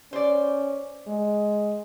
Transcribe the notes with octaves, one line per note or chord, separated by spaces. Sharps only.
C#4 C5 D5
G#3